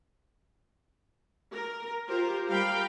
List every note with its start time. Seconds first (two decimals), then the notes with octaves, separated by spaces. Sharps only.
1.53 A#4
2.09 F4 G4 A#4 C5
2.49 G3 A#4 F5 G5 B5